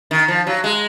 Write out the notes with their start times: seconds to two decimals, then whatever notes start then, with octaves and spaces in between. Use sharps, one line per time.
0.11 D#3
0.28 F3
0.47 F#3
0.64 G#3